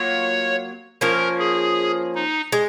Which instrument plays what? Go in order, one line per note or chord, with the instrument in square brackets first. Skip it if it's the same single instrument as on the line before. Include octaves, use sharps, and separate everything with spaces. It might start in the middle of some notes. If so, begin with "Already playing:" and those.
Already playing: [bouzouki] F#3 A#3 F4 [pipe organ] C#5
[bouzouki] F3 A#3 C#4 [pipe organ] A#4
[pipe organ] G#4
D#4
[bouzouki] G#3